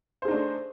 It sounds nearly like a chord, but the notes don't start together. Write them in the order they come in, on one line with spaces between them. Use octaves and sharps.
C5 G#4 D#4 D4 A3